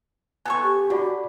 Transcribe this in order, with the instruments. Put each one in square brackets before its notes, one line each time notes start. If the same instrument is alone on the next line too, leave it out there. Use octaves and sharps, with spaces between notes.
[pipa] B3 A4 C#6 [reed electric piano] G#5
[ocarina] G4
[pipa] D3 [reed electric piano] F#4 D5 B5